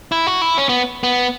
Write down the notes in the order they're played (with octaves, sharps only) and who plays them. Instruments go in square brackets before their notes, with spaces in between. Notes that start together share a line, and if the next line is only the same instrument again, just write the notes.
[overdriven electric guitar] E4
F#4
E4
C#4
B3
B3